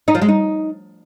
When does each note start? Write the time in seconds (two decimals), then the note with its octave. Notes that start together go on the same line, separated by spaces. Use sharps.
0.08 D#4
0.15 F3
0.22 G#3
0.28 D#4